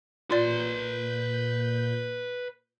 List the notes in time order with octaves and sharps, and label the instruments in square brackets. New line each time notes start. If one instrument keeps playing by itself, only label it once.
[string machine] A#2 G6 [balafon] F4 D5 [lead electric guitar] B4 C6